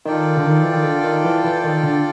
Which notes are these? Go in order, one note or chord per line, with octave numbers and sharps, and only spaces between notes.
D#3 F4 A4 D5 G5
D3
D#3
E3
D#3
D3
D#3
E3
E3
D#3
D3